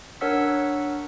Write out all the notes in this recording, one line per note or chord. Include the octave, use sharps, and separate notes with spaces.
D4 A#4 C#5 F#5 E6 B6